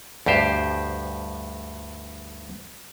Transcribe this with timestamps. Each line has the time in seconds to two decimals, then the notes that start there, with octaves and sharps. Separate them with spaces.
0.26 D2 G2 G4 C5